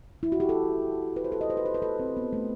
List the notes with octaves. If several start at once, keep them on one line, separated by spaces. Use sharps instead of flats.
E4
F#4
G4
A4
B4
C5
A4
D#5
C5
B4
C5
B4
A4
C4
B3
A3